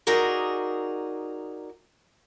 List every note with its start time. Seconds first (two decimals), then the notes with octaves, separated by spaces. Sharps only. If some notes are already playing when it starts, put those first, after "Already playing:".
0.07 D#4 F#4 G#4 A#4 D5